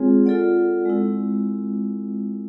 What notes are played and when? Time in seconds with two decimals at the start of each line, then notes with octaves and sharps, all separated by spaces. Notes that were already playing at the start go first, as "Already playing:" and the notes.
Already playing: G#3 C4 F4 G#4 C#5
0.26 F4 A4 D5 F#5
0.86 G#3 C4 E4